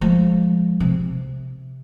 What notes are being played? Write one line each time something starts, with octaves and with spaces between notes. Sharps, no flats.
F3 G#3
C3